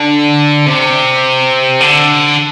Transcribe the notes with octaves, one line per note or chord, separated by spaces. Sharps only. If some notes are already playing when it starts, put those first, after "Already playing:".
Already playing: D3
C3
D3